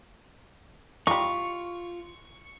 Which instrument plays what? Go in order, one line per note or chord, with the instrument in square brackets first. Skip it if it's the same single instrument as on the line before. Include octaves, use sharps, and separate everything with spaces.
[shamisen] G3 D#4 [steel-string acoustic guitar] F4 [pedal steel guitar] C#6